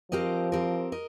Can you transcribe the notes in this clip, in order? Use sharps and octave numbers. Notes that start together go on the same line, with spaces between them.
F3 C4 G4 A#4 D#5
C4 G4 A#4 D#5
A#4 D#5